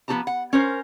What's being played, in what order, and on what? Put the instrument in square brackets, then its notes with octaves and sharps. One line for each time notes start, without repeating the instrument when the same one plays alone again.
[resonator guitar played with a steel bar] F3 B3 F#4 G4 A5 A#5
F#5
C#4 A#4 C5